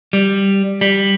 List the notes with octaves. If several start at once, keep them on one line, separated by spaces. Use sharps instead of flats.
G3
G3